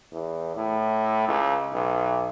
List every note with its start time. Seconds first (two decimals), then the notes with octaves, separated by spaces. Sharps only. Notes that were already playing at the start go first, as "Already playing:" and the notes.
0.12 E2
0.56 A2
1.28 C#2
1.73 B1